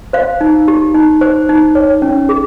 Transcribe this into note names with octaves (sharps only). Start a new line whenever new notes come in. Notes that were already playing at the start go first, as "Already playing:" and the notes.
C5 F5
D#4
G4
D#4
C5
D#4
C#5
C#4
G#4